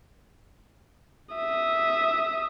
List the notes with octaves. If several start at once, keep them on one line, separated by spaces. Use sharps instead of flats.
E5 D#6